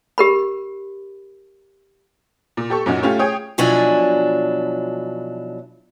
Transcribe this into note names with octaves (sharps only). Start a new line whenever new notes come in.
G4 A#4 B5
A#2
G4 A4 C#6
F#2 A#2 C#4 D#4 F#4
A3 C#4 F4 G4
G#4 C#5 G5 D#6
B2 F3 F#3 D4 E4 G#5